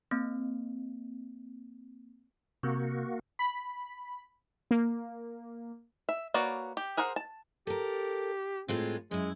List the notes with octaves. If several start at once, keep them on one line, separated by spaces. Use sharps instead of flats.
A#3 C4
C3 A#3 F#4
B5
A#3
E5
A#3 F#4 B4 C#5 D5
G4
G#4 A#4 C5 F#5
A5
G4 A4 A#4
A2 G#3 C4 F4
F#2 G#3 E4